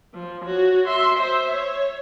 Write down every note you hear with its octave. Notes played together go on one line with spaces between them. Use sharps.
F3
F#4 C#5
E5 C6
C5 E5
C#5